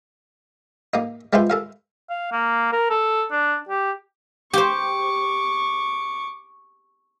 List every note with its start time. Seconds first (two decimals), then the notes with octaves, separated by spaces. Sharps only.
0.94 A#3 D#4
1.33 G#3 C4 E4 F4 B4 C5
1.50 A4 A#4 F5
2.09 F5
2.32 A#3
2.73 A#4
2.90 A4
3.31 D4
3.69 G4
4.53 G4 C5 C#6 D6